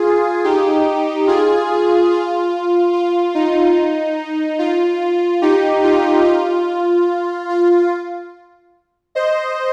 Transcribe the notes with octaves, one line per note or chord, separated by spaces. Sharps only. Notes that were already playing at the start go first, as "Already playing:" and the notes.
Already playing: F4 G#4
D#4 G4
F4 G#4
F4
F4
D#4
F4
D#4 G4
F4
F4
F4
C5 D#5